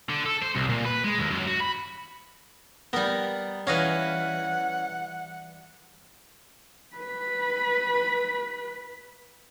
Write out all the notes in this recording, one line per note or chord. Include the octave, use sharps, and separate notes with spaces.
D3
A4
C5
C2
A#2
B4
G#3
D#2
F#2
F#4
B5
G3 B3 A#4
E3 C#4 D#5 F5 F#5
B4 B5